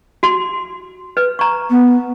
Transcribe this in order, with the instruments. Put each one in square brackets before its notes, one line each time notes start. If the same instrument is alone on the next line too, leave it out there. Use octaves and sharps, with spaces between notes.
[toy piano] F#4 C6
B4
A#5 C#6
[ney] B3